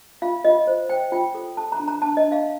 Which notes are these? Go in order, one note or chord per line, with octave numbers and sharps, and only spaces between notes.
F4 F5
F4 D#5
C5
C5 G5
F4 G5
A4
A4 A5
A#5
D4
A#5
D4 A5
D#5
D4
F5